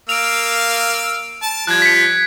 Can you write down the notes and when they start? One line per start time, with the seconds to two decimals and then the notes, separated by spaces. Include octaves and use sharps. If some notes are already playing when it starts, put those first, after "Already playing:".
0.09 A#3 F5 E6 D7 F7
1.42 A5
1.67 F3 G3 F#6 G#6
1.82 B6 C#7